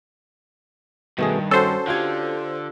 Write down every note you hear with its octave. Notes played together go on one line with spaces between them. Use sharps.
G2 B2 D#3 A3 G#4
C#4 F#4 A4 C5
D3 F4 G4 G#6